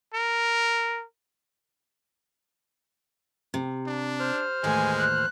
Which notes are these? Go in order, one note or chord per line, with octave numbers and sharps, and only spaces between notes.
A#4
C3
D4
C5 F6
D#2 A2 E3 G#3 G#5
F#6